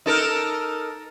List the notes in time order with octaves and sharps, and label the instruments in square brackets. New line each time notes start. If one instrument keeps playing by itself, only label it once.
[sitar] D#4 A4 A#4